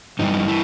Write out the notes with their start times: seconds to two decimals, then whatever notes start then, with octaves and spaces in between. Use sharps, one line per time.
0.19 G2 E3 G3 D#4
0.48 E4